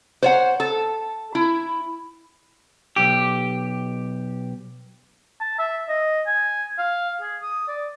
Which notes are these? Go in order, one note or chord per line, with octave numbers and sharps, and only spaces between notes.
C5 C#5 F#5
A4
E4
B1 G4
A5
E5
D#5
G#5
F5
G#4
D#6
D5